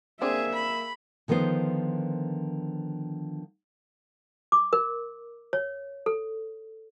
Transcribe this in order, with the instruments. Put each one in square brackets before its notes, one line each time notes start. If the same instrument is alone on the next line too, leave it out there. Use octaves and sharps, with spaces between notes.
[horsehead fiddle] A#3 E5 [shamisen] C4 D4 [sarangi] G#4
[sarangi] B5
[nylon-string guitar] D3 D#3 F3 B3 C5
[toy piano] D6
A#4
C#5
A4